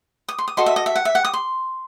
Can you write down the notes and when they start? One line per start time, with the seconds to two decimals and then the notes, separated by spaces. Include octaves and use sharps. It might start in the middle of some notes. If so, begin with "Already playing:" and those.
0.29 D#6
0.38 C6
0.48 D#6
0.57 F#4 A4 D#5 C6
0.66 E5
0.76 D#5
0.86 E5
0.96 F#5
1.05 E5
1.15 F#5
1.25 D#6
1.33 C6